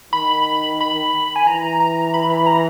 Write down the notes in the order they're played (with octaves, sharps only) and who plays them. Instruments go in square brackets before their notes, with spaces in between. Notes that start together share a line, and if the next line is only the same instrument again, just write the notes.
[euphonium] D#3 [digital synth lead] B5
[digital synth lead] B5
G#5
[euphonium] E3 [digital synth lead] A#5
[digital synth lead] A#5
B5
B5
A#5